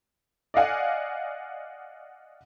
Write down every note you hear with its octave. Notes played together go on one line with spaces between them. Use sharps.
D5 D#5 F5 F#5 G#5